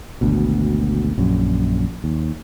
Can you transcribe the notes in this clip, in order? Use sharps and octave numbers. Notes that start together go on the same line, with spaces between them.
G#1 D2 B2
A#1 F#2
D#2